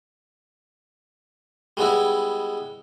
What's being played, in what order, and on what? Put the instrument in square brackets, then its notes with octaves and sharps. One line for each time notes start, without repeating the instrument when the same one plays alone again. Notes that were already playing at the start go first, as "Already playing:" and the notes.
[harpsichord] G3 G#3 B3 E4